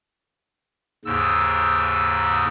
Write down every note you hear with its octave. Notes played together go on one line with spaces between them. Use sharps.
D#2 G#2 C#3 E6